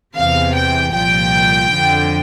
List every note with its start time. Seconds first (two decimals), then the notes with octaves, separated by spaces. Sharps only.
0.16 E2 C3 E3 F5
0.55 G5
0.94 C2 A#2 F3 G5
1.74 F2 D3 F3